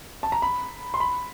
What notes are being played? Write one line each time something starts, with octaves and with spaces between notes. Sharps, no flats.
A5
A#5
B5
C6
B5